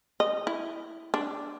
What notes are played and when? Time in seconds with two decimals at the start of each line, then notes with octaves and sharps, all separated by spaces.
0.20 D#5
0.47 E4
1.14 D4